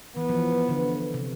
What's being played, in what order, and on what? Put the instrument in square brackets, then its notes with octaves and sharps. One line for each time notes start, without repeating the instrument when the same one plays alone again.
[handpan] E3 [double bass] B3
[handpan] F3
E3
F3
D3
C3